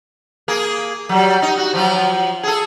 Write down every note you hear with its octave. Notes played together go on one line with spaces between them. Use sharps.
A#3 G#4
F#3 G3
D#4
F#4
F3 F#3 F4
G#4 A4